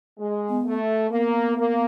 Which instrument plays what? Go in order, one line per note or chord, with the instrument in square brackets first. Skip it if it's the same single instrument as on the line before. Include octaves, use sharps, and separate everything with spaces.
[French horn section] G#3
[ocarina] B3
[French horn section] A3
[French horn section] A#3 [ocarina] B3
[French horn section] A#3